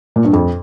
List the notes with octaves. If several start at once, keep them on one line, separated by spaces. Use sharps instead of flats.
A#2
G2
F2